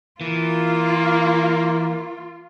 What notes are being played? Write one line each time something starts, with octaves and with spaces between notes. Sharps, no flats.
E3 A#3 F4